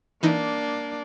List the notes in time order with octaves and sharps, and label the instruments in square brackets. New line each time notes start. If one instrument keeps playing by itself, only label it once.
[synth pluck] E3 D#4 [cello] A#3 D4